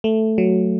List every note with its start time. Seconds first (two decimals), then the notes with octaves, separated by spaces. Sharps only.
0.04 A3
0.38 F#3